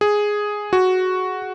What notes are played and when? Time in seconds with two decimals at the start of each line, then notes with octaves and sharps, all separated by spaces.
0.01 G#4
0.73 F#4